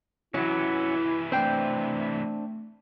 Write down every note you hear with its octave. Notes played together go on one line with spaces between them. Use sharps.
C3 E3 F#3 C#4 E4 F#4
A3 C4 D4 C5 G5